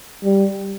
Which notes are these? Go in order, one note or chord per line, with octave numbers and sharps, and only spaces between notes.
G3